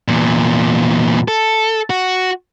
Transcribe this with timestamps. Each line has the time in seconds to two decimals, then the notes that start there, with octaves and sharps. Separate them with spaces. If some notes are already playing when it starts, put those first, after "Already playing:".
0.08 E2 A#2
1.28 A4
1.90 F#4